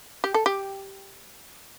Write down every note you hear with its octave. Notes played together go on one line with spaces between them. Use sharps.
G4
A4
G4